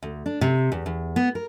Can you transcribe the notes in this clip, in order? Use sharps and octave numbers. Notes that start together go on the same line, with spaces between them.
D2
D4
C3
E2
E2
B3
A#4